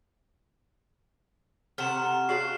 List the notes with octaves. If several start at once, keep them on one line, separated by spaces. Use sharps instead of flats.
C3 A4 F#5 A#5 C#6 F6 E7
C#4 D4 F#4 G#4 F5 C7